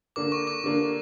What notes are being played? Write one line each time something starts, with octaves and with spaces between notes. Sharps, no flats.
D3 A#3 D4 D6
C#6
D6
D3 A#3 D4